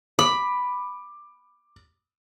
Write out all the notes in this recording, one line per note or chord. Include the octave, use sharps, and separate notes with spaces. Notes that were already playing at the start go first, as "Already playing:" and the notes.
B5 D6